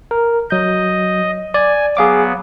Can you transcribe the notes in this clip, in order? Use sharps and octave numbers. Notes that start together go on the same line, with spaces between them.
A#4
F#3 D#5 G6
D5 G#5
F#3 B3 G#4 F5 D6